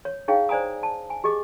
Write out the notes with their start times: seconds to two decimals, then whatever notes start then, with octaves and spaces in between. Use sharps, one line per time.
0.05 C#5
0.28 D#4 E4 G#4 C#5 F5 G5
0.49 C5 D5 G#5 A#5 D#6
0.83 A5
1.10 G#5
1.24 G4 G#4 D#5 D6